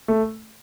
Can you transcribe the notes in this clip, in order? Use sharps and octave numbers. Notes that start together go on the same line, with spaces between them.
A3